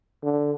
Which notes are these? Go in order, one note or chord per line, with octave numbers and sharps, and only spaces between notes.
D3